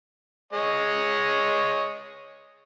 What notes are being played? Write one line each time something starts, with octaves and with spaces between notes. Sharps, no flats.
G#3 C#5 D#5